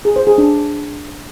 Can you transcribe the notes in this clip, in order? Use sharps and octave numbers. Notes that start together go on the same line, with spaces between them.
G#4
C5
G#4
D4